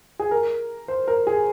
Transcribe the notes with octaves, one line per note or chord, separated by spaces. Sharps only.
G#4
A#4
C5
A#4
G#4